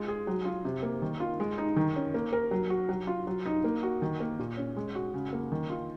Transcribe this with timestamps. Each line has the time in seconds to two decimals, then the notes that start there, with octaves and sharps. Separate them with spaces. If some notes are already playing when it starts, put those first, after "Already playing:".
Already playing: G#3 F4
0.08 G#4
0.27 F#3
0.45 F4
0.65 C3
0.83 A#3
1.02 D#3
1.20 F4
1.40 G#3
1.58 D#4
1.76 D#3
1.96 C#4
2.14 A#3
2.33 A#4
2.51 F#3
2.70 F#4
2.89 F#3
3.07 F4
3.27 F#3
3.46 D#4
3.64 A#3
3.83 F#4
4.02 D#3
4.20 A#3
4.39 A#2
4.57 C#4
4.77 G#3
4.95 F#4
5.14 C#3
5.33 A#3
5.52 D#3
5.70 F4